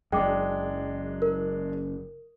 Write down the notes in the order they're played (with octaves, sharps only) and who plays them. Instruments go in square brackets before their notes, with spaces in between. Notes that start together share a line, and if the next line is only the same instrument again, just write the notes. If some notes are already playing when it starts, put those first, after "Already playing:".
[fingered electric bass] F#1 F#2 [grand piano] G#3 D4 [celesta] G5 D6
[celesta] A#4